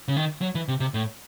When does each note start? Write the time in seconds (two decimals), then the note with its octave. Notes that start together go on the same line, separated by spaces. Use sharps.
0.08 C#3
0.17 D#3
0.41 F#3
0.55 E3
0.68 C3
0.80 C3
0.94 A2